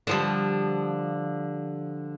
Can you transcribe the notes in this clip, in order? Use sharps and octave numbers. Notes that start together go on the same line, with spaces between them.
D3 F3 G3